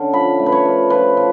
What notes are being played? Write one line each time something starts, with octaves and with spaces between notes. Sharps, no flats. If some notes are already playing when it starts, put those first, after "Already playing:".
Already playing: D3 C#4
F3 B5
A3
B4
C#5
F3
F3 B4
F3